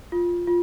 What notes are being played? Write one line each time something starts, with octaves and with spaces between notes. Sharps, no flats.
F4
F4